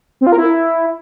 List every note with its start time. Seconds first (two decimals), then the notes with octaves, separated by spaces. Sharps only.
0.21 C4
0.27 F4
0.32 A#4
0.38 E4